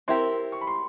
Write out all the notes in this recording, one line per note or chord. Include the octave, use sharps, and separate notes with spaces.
C4 E4 G4 A#4 C6
C#6
B5
C6